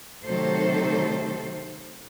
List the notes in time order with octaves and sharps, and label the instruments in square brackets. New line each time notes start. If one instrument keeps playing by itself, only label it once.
[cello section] C3 D#3 F#3 A3 A4 C5